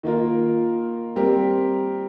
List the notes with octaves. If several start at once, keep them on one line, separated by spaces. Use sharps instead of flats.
D#3 A#3 F4 A#4
G3 C4 G4 A#4